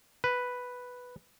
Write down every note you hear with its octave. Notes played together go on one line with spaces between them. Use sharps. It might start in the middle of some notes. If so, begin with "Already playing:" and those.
B4